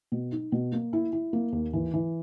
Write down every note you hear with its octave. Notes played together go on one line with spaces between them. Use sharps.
B2
D#4
B2
A#3
E4
E4
A#3
D#2
E3
E3